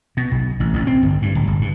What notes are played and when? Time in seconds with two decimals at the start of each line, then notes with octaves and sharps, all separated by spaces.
0.17 B2
0.32 B1
0.60 A1
0.74 A1
0.87 C4
1.03 G1
1.22 G2
1.35 D1
1.47 G1
1.61 G2